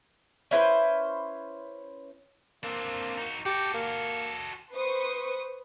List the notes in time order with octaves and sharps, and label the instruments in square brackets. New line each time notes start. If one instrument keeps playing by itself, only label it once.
[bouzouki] C#4 E4 B4 C5
[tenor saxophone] A#3 [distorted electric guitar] C4 D4
[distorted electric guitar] D#4 F#4
[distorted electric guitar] F#4 A4 [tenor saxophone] G4
[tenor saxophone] A#3
[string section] B4 C5 C6 C#6 D#6